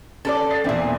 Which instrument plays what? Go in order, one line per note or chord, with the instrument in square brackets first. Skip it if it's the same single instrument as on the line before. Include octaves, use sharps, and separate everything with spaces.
[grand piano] C#4 [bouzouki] A4 A#4 D5
[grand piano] D#6 A6 C7
[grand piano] E2 D4 E4 [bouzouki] A#2 C4